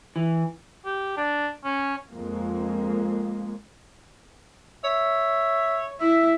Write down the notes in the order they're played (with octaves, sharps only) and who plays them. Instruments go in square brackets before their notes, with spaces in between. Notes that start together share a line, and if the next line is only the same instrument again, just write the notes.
[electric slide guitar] E3
[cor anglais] G4
D4
C#4
[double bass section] F2 G#3 A#3
[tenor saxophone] C#5 [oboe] E5
[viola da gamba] E4 [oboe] E5